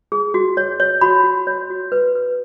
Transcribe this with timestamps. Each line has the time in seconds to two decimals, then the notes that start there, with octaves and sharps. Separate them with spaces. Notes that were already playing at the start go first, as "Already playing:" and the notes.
0.12 G#4
0.34 F#4
0.57 C#5
0.80 C#5
1.01 F#4 B5
1.24 F#4
1.47 C#5
1.70 F#4
1.92 B4
2.15 B4